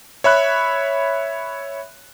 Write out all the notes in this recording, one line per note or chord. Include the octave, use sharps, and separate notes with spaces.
C#5 E5 B5 F#6